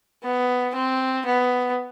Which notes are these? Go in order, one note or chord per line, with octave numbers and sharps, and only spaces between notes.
B3
C4
B3